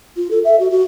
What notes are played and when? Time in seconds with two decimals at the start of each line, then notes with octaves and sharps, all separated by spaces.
0.16 F4
0.31 A4
0.45 E5
0.59 F#4
0.71 F#4